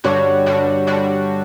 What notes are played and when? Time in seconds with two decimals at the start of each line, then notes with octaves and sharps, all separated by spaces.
0.04 G2 D3 G3 D4 F#4 C#5
0.46 G2 D3 G3 D4 F#4
0.87 D3 G3 D4 F#4